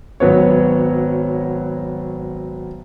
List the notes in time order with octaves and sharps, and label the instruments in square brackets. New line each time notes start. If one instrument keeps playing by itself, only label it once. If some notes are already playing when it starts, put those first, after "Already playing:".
[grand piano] G#1 F#3 B3 C#5